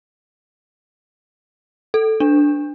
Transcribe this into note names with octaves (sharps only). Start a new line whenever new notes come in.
A4
D4